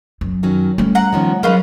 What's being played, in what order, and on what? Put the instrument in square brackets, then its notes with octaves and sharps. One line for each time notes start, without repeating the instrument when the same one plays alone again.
[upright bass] F#2
[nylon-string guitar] D#3 F#3 C#4
[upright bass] G3 A3 [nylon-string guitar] C#4
[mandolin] F#5 A#5
[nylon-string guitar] D#3 F3 C#4
[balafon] F#3 A#4 [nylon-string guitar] G#3 [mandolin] C#4 F4 B4